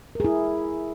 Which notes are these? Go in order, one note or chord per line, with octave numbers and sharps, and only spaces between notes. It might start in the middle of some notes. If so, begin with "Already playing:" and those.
E4 G#4 A#4